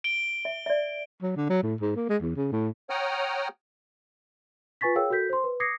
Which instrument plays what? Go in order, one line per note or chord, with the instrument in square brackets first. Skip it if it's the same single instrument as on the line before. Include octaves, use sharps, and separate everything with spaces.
[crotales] D7 G7
[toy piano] E5
D5 E5
[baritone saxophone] F#3
D3
F#3
A2
G#2
A#3
G#3
E2
C#3
A2
[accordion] C#5 F#5 G5 A#5 D#6 F6
[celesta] F4 B4 G#5 C#6 A6 B6
G#4 A#4 C#5 F5 G5 E6
F#4 A4 A#4 G6 B6
C5 C6
B4
D6 D#6 G#6 A#6 C7 C#7